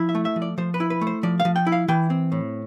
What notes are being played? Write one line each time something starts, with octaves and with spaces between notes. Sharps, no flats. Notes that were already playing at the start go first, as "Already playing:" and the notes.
Already playing: F3 E4
E5
A3
E5
F3
D5
F3 C5
B4
E4
B4
A3
C5
F3 D5
F5
F3
G5
E4
F5
E3 G5
C4
A2